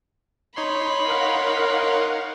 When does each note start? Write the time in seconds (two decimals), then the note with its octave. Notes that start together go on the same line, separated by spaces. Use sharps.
0.56 D#4 C#5 B5 C6
1.02 A#4 F5 F#5